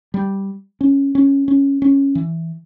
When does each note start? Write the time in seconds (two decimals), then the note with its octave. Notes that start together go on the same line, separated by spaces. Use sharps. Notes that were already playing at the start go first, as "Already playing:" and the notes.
0.14 G3
0.81 C#4
1.15 C#4
1.48 C#4
1.82 C#4
2.15 E3